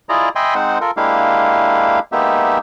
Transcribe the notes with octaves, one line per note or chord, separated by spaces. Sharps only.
E4 F4 G#4 D5 D#5 A#5
D#5 E5 G5 G#5 B5 C6
G#3 C4 D#4 C5 F#5
F4 A4 A#4
G#3 A#3 D4 E4 G4 F5
G#3 A#3 B3 D#4 G4 E5